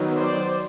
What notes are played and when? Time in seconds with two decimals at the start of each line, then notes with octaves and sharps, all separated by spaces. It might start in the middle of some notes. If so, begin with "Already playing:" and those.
Already playing: D#3 F#3 B3
0.18 C5 D5